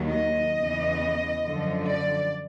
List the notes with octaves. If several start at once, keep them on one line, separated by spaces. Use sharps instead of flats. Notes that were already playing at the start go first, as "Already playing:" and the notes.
Already playing: D#2 D#3 F#3
D#5
E2 C#3 E3
F#2 D3 F3
D5